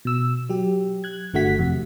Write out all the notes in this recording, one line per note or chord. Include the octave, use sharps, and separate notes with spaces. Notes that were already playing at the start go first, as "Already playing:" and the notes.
B2 E6
F#3 G4
F#6 G#6
G1 D3 A3 F#4 F#5 B6
F2 C3